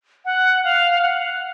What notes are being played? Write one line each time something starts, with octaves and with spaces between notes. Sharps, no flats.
F#5
F5
F#5